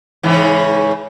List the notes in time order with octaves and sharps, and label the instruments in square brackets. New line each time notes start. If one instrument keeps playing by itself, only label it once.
[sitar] G#2 C#3 E3